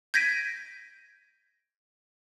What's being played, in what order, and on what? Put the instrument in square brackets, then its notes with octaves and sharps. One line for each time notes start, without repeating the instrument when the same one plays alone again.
[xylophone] G6 G#6 A#6 B6 D7 D#7